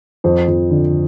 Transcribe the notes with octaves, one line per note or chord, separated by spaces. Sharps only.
F2 C5
F2
D3